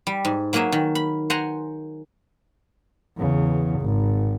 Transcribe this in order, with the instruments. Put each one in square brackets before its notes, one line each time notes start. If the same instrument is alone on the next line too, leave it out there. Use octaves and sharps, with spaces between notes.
[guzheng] G3
G#2
F#3 A#3 F#4 G#4 E5
D#3
B5
C5 F#5 G#5 A#5 C6
[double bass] E2 C#3
G#1